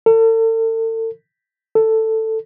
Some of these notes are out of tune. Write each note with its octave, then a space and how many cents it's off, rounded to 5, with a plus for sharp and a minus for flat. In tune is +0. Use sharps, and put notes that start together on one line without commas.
A4 +40
A4 +10